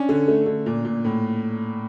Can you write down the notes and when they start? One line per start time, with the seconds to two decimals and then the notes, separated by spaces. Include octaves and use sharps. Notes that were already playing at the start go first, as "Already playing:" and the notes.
Already playing: C#4 D4
0.09 D3
0.28 A3
0.46 D3
0.66 A#2
0.85 A#2
1.05 A2